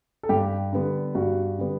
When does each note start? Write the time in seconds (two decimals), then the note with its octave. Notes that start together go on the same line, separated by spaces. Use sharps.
0.23 A4
0.29 G2 G4
0.73 D3 G3 B3
1.15 G2 F#4
1.58 D3 G3 B3